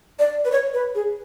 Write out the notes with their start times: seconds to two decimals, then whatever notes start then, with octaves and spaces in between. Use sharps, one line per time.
0.19 D5
0.45 B4
0.52 C#5
0.74 B4
0.95 G#4